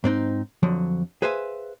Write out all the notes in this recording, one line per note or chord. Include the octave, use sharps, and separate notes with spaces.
G#2 C4 D4 D#4
F2 D3 F3 F#3
G#4 B4 C5 E5 F5 G#5